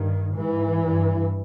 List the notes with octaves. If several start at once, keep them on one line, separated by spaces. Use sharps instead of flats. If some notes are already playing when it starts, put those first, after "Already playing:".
Already playing: G2 D#3
G#2 E3
G2